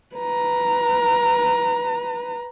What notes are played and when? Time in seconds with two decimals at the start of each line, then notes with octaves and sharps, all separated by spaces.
0.16 B4 A#5